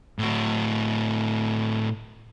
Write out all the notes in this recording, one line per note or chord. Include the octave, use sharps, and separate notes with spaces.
A2 F#4